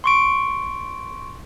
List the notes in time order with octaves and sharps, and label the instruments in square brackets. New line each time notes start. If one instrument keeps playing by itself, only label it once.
[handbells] C6 C#6 D7